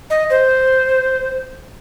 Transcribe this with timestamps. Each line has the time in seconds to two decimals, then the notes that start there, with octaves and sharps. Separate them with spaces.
0.10 D#5
0.30 C5